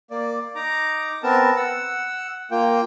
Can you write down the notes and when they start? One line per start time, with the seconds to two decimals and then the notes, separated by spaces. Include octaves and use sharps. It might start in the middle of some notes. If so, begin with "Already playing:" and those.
0.11 A#3 D5
0.55 D#4 A#5 D6
1.23 B3 C4 A#4 A5
1.56 F#5 E6
2.51 A#3 F4 G5